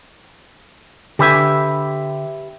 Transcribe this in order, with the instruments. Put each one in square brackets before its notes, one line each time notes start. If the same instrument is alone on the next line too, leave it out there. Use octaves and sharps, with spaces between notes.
[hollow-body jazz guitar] D3 G#5 [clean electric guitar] G4 B4 E5